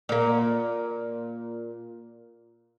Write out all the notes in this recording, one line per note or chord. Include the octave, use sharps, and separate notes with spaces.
A#2 A#3